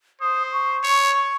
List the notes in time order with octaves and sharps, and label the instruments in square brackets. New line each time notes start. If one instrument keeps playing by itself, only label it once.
[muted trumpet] C5 [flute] D#6
[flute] C#6
[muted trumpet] C#5